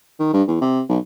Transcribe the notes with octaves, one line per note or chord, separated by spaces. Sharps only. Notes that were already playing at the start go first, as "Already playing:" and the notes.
D#3
G2
E2
C3
B1